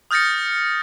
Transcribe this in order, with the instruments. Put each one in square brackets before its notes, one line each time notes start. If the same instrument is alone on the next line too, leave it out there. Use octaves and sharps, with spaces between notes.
[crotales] D#6 F6 G6 A6 A#6 C#7